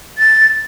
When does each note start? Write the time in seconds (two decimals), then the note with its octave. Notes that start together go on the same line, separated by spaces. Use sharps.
0.18 A6